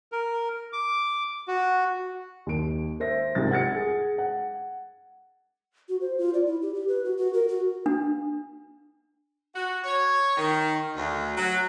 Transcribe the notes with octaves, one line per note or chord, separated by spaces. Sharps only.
A#4
D6
F#4
D#2 D7
C5 E5 A#6
C2 G#2 C3 F4 A6
F#5 G#6 A6 C#7
G#4
F#5
F#4
C5
F4
D5
E4
G4
G4
B4
F#4
F#4
A#4
F#4
D4
F#4
C#5
D#3
D2
F#3